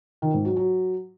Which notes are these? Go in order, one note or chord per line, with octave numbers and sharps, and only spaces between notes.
D#3
G#2
F#3
F#3